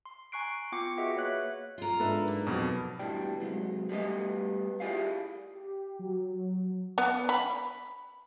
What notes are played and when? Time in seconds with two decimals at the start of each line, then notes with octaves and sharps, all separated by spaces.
0.06 C6
0.32 G#5 A#5 C#6 F#6 C7 D7
0.72 B3 F4 G5 C#6 D6 C#7
0.98 F#4 G#4 B4 D#5 E5 F#5
1.16 A#3 C#5 E5 F#6
1.78 F4 A#4
2.00 G#2 G#3 D4 A4 B4 E5
2.28 A#3
2.47 F2 B2 F#3 B3 F#4
2.99 D2 B2 E3 G3 D4 G5
3.40 C3 F#3 G#3
3.89 G3 A3 B3 G4 B4 D#5
4.80 E4 F4 G4 G#4 D5 F5
5.55 G4
5.99 F#3
6.98 B3
7.29 B5